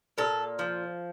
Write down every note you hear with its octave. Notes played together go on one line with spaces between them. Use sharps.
A#2 A4
F3